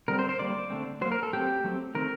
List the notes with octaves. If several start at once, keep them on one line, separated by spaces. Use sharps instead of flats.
D3 G3 C4 A#4
C5
C5
D3 G3 A#3 D5
D3 A3 C4
F#3 A#3 C5
A#4
A4
F#3 A3 C4 G4
F#3 A3 C4
D#3 A3 C4 A#4